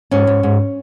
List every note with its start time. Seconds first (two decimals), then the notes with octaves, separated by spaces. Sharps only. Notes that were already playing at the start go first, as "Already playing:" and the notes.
0.11 G#2 C#4
0.27 G#2
0.43 G#2